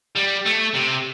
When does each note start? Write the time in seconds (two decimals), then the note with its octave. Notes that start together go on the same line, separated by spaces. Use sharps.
0.15 G3
0.46 A3
0.75 C3